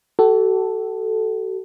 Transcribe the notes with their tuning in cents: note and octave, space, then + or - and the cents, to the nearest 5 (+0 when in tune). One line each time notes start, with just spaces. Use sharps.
F#4 +45 A4 +0